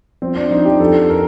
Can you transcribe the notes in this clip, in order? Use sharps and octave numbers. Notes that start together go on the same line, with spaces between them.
F3 C4
D4
F3 D#4
G4
F2 A4
A#4